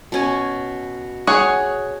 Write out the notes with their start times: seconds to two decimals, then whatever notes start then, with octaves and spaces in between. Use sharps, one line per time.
0.12 B2 C#4 G#5
1.27 G#4 C#5 F#5